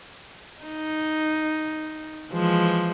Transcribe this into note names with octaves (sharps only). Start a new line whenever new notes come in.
D#4
E3 F3 G#3